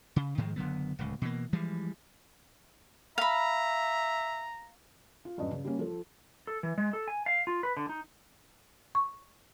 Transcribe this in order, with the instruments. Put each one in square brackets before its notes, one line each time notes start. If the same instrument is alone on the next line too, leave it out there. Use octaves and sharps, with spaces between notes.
[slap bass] C#3
G#2 D#3 F3 G#3
F#1 D3 F#3 B3
D1 C#2
B2 E3 A#3
E3 F3 G3 G#3
[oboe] E5 [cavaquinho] F5 B5 [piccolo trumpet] A#5
[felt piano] F4
D#1 G2 F#3 C#4 D#5
C#3
G3 A#3 C#4
F3 A4
[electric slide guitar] A4
E3
G#3
A4
G#5
F5
F4
B4
D3
D#4
[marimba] C#6